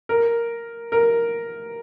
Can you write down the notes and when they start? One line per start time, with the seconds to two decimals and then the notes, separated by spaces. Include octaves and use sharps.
0.09 A#4
0.92 A#4